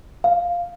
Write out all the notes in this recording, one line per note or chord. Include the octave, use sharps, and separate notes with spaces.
F5